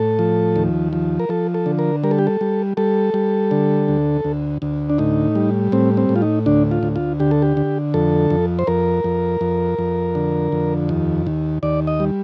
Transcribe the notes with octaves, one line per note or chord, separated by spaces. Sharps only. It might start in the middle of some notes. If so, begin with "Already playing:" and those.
Already playing: A2 A4
F3
D#2
F3
A#4
F3 A4
A4
D3
A#4
G3 A#4
A4
G4
A4
G3
G3 A4
G3
D3
D2
D2
D2
D4
A2 D#4
G3
A2 C4
C4
A2
F4
D#4
D2 D4
F4
D2
F4
D3 G4
A4
G4
D3
F2 A4
F2
C5
F2 A#4
F2
F2
F2
D3
F2
D#2
D#2
D#2 D5
D#5
G3